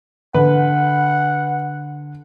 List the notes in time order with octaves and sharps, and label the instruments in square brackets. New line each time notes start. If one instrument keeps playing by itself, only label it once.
[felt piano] D3 [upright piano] B4 [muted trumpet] F#5